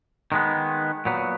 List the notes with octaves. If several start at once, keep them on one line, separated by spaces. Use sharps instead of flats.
D#3 G#3 B3
A#2 F#3 B3